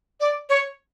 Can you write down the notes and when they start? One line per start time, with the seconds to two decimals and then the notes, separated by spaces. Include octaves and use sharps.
0.20 D5
0.49 C#5